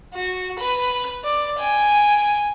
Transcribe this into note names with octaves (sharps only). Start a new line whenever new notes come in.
F#4
B4 F#6
D5
G5 G#5